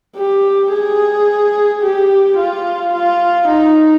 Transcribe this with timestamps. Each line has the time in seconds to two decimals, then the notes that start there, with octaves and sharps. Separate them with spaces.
0.17 G4
0.72 G#4
1.82 G4
2.37 F4
2.93 F4
3.48 D#4